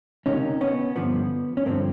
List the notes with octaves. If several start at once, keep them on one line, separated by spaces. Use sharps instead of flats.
C#2 C3 D#3 C#4 D#4
B3 C#4
G2 D3 F3 B3
C#4
G2 D3 F3 A#3 C4